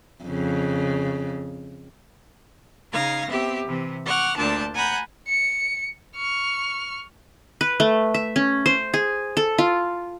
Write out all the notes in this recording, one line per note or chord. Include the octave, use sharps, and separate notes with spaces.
F2 C#3
C#3 D#4 F5 G#6 A#6
B3 C4 G4 E5
C3 E3
F#5 C#6 D6 F6 F#6
D2 A#2 D4 A5 G6
F#5 G#5 A#5 B5 F#6 G6
C#7
C#6 F6
B4
A3
E5
C#4
C5
G#4
A4
F4